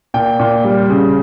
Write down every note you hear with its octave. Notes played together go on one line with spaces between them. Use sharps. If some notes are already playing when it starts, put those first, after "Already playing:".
A#2 G5
A#2
G3
C#3